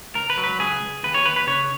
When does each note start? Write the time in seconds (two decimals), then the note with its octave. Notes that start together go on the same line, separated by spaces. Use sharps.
0.15 C#2 A#4
0.30 B4
0.37 F#3
0.44 B4
0.59 C#2 G#4
0.82 C#2
1.03 D#2 B4
1.14 C#5
1.25 D#2 B4
1.36 B4
1.47 C#3 C#5